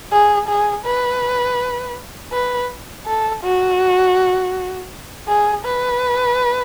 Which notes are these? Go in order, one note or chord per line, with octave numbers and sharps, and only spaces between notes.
G#4
G#4
B4
B4
A4
F#4
G#4
B4